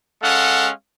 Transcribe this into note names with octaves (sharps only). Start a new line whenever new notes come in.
G#3 C#4 A4 F5 F#5